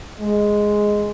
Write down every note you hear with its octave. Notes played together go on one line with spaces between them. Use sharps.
G#3